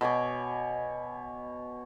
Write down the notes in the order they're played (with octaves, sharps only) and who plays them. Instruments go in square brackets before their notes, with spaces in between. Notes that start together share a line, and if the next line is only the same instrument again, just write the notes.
[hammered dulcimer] B2 C#5 G#5 D6